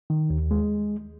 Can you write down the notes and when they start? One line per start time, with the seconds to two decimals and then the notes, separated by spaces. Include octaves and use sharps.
0.10 D#3
0.30 D#2
0.51 G#3